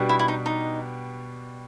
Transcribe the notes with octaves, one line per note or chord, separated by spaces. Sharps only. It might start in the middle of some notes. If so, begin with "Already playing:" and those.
Already playing: B2 G3 B3 D4 G4
E4
E4
D#4
D#4